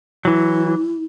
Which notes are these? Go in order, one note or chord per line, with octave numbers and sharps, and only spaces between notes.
E3 F#3 E4